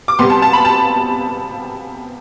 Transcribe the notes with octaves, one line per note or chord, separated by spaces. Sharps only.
D6
C3 G3 B3 C6
A5
A5
B5
A5